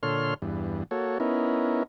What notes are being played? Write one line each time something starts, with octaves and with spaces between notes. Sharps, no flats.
A#2 D3 A4 C#5 C6 F6
E2 G2
A#3 F#4 A4 C#5
B3 C#4 D#4 E4 A#4